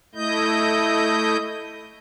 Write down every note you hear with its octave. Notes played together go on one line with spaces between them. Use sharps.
A3 E4 D#5 G6